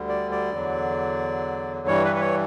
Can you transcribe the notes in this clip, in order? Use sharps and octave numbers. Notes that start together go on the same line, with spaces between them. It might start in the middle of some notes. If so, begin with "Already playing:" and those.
Already playing: D2 D3 G3
D5
D5
E2 D3 F#3
G2 E3 G3 C#5
B4
B4
C#5